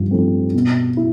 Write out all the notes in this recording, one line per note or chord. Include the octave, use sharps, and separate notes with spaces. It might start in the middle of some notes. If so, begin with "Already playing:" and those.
Already playing: G2 F3
F3 A3 C4
B2
E4